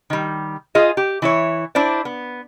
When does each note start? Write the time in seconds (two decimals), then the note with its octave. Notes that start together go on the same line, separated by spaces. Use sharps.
0.10 D#3 G3
0.75 F4 G#4 D#5
0.97 G4
1.22 E3 E4 C#5
1.75 D4 E4 C5 D5
2.05 B3